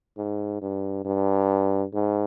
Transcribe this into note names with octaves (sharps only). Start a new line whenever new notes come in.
G#2
G2
G2
G#2